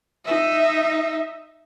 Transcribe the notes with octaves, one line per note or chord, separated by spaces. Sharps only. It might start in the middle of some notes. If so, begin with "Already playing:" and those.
D#4 E5